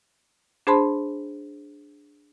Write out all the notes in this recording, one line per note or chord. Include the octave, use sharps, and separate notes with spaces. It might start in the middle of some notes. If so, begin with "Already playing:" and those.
D4 G#4 C5 A5 B5 C6